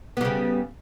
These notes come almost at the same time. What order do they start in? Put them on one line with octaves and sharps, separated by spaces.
B3 G3 C#3